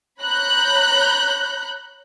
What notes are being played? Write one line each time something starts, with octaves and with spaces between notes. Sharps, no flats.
C#5 A#5 B5 F#6 G6